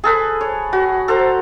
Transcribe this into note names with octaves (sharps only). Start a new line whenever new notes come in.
G#4 A4 B4
C#5
F#4
A4 C5 A#5